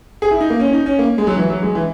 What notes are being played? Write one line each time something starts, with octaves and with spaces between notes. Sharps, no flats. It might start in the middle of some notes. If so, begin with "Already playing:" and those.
G#4
E4
D#4
A#3
C#4
D#4
C#4
A#3
G#3
F#3
E3
F#3
G#3
E3